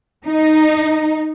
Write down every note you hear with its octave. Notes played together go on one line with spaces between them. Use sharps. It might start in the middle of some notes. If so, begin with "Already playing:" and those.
D#4